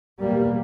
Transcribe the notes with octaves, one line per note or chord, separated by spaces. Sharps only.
E2 B2 G3 A#3